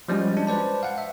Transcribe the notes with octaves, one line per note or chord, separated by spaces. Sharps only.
F3 G3 G#3 C#4 F#4
G#3 D4
B4 C5 D5 A5
F5 F#5
E5